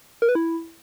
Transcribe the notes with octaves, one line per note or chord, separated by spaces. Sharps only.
A#4
B4
E4